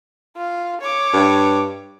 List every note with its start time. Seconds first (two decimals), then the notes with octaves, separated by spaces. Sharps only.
0.37 F4
0.81 C#5 D6
1.13 G2